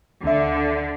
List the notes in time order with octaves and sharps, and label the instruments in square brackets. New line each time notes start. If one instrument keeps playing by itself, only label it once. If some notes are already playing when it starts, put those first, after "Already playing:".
[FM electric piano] D2 E5 [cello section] D3